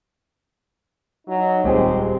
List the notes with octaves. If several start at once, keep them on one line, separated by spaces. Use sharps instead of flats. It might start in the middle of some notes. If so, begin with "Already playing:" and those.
F#3 D#4
D#1 G#3 C4 G4 G#4